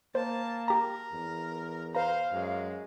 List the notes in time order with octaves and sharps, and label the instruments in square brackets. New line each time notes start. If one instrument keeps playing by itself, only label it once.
[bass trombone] A#3 [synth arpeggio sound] C5 [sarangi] A5
[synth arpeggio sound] G4 A#5 [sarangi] A#4
[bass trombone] E2
[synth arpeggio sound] B4 A#5 [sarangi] C5 [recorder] F5
[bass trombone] F#2 [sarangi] G#3